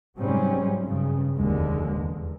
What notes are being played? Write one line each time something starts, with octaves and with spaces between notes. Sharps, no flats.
G#2 C3 F#3 G3 C4 C#4
G2 C#3
F1 D#2 D3 G#3
E2